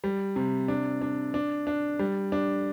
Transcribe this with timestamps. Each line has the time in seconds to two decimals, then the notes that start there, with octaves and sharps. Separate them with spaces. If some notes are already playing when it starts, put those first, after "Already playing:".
0.04 G3
0.36 C3
0.68 D4
1.02 D4
1.34 D4
1.67 D4
1.99 G3
2.32 D4